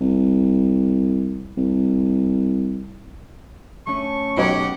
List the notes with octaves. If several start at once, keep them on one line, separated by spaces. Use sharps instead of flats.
C2
C2
A3 C#4 C#6
B1 G4 C#5 F#5